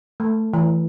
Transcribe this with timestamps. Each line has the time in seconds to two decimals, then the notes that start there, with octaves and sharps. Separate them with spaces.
0.20 A3
0.53 E3